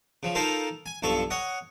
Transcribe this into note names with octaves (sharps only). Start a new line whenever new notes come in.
C#3 F3
D#4 F4 A4 A#4 C5 F5
G#5
B1 G2 F3 A4 C#6
C#5 D#5 F#5